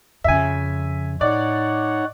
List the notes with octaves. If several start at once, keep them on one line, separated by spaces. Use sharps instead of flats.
F2 C#3 E5 G#5
A2 D#4 C#5 D5 F#5